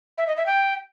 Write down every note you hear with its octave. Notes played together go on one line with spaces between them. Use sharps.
E5
D#5
E5
G5